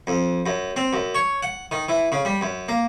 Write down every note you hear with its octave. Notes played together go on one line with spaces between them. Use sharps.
F2
F#2
C4
F#2
C#5
F#5
D#3
E3
C#3
G3
F#2
A#3